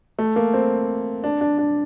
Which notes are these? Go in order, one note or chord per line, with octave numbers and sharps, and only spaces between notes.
A3
A#3
C4
D4
D4
D4